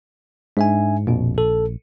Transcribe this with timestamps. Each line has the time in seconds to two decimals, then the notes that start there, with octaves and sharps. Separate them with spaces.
0.57 G#2 D4 E5 G#5
1.07 A#1 F2 B2
1.38 A4